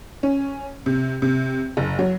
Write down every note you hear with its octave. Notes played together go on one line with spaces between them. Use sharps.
C#4
C3
C3
F#1
F#3